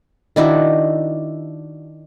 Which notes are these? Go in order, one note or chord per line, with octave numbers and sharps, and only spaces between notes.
D#3 D4 E4 F#4